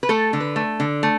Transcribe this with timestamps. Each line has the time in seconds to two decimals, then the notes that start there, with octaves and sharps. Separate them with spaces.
0.03 B4
0.09 A3 A4
0.33 D3
0.40 B4
0.56 A3
0.80 D3
1.03 A3